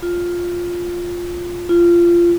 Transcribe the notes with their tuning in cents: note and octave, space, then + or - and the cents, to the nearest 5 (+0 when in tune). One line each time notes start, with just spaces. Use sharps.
F4 +5
F4 -20